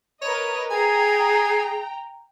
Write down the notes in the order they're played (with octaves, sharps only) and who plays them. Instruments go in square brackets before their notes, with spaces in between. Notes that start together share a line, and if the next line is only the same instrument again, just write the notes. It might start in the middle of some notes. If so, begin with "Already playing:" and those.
[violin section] A#4 B4 D#5 [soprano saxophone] C#5
[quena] G#4 [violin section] G5 A#5 [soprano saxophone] G#5